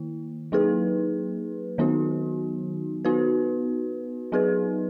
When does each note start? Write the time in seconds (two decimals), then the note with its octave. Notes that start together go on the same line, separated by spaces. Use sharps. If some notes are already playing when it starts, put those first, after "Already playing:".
Already playing: D#3 A#3 E4
0.52 F#3 A#3 D#4 G#4 B4
1.78 D#3 F#3 B3 D#4 F#4
3.05 B3 D#4 F#4 B4
4.32 F#3 B3 D#4 G#4 B4